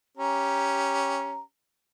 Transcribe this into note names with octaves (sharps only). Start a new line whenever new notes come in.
C#4 G4 A#5